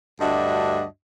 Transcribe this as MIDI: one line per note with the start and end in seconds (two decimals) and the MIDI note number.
0.20 0.83 38
0.20 0.83 43
0.20 0.83 62
0.20 0.83 66
0.20 0.83 75
0.20 0.83 76